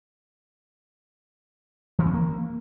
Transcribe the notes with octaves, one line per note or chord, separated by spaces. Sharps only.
E3
C#4
A#3